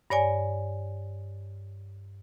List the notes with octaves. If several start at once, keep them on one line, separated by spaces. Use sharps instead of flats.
G2 C#5 D5 G#5